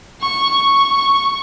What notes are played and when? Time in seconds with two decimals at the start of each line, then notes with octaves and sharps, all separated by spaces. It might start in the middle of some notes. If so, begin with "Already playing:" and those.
0.21 C#6
0.49 C#6